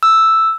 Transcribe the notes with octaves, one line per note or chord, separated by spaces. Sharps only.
E6